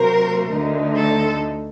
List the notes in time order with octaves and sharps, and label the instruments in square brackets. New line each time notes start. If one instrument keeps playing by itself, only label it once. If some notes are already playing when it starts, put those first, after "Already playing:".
Already playing: [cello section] C3 F#3 A#3 F#4 C5 [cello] A#4
[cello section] D2 D3 A3 D#4
[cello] A4